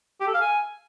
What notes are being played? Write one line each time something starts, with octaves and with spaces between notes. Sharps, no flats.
G4
A4
F5
G#5